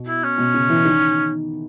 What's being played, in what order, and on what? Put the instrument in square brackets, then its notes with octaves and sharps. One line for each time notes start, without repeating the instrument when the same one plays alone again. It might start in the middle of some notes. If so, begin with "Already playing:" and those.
Already playing: [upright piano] B2
[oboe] E4
C#4
[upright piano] B2
C#3
E3
D#3